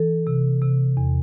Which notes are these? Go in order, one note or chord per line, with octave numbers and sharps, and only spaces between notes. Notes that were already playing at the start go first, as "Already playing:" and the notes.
Already playing: E3 A4
C3
C3
E2